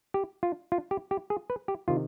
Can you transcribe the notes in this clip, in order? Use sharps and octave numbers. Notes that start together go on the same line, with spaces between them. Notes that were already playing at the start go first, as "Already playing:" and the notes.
G4
F4
F4
G4
G4
G#4
B4
G4
C3 D#3 F4